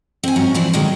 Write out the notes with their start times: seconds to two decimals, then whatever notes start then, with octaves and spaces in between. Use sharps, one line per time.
0.23 C4 G#5
0.36 G#2 F#3 C#4 F4 F#4
0.54 E3 F3 C4 D4 E4
0.73 A#2 D3 D#3 F#3 G#3